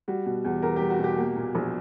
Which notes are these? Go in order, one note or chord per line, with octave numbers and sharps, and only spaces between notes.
G3 F#4
B2
E2
E2 A#4
G4
G3
F#4
B2
G4
A#3
A#2
A#1